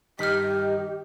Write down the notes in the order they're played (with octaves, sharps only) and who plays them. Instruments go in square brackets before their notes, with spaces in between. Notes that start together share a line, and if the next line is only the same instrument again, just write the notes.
[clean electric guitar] G2 D#3 D#4 [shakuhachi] G4 [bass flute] D#5 [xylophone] F6 B6